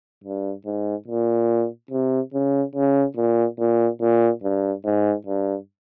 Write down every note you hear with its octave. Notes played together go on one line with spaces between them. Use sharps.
G2
G#2
A#2
C3
C#3
C#3
A#2
A#2
A#2
G2
G#2
G2